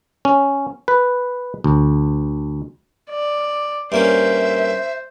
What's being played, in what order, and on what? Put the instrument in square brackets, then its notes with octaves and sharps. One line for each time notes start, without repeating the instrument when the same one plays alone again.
[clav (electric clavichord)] C#4
B4
D2
[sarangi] D5
[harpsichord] G2 A#3 C#4 [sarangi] C5 [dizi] E5